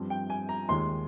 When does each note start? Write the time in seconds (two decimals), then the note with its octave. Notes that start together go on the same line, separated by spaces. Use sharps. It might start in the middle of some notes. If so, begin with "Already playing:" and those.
Already playing: G2 F3 C4
0.10 G5
0.30 G#5
0.49 A#5
0.69 D#2 D#3 G#3 C6